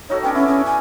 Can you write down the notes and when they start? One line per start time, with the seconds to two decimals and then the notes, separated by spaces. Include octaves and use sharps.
0.09 D#4 F#4 A4 C#5
0.23 B3 C#4 D4 G5
0.35 C#4 E4
0.48 C#4 G#4
0.66 G#5